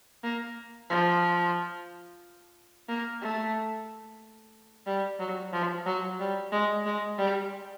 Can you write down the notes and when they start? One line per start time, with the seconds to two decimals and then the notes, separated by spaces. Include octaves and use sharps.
0.23 A#3
0.90 F3
2.88 A#3
3.21 A3
4.86 G3
5.20 F#3
5.53 F3
5.86 F#3
6.20 G3
6.52 G#3
6.85 G#3
7.18 G3